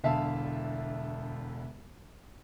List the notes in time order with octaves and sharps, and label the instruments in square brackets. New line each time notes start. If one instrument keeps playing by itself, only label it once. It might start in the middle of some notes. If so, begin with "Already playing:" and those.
[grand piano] E1 E2 D3 E5 F5 A5